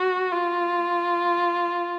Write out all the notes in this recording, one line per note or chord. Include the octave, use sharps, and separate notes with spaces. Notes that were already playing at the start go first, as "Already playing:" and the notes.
Already playing: F#4
F4